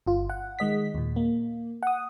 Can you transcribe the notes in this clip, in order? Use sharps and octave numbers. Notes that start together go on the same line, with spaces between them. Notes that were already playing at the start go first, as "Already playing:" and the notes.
G1 F4
F#5
D#3 G#3 D#5 B6
D#2 A#2
A#3
F#5 D#6